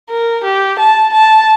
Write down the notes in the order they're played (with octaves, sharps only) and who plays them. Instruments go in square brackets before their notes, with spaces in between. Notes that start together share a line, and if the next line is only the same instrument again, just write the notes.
[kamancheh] A#4
G4
A5
A5